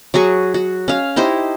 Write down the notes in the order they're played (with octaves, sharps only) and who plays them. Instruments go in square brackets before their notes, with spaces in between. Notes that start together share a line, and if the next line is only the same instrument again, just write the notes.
[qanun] F#3 F#4 G#4 C#6
F#4
C#4 F5
D#4 E4 G4 C5